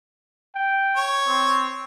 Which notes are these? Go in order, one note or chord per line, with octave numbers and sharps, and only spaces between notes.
G5
C#5
C4